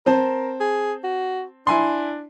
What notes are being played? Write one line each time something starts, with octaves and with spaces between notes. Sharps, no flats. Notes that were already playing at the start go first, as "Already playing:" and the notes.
C4 A#4 C5 A5
G#4
F#4
D4 E4 G#5 C6